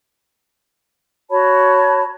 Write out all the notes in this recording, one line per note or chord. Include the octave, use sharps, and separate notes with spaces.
F#4 C#5 A5 B5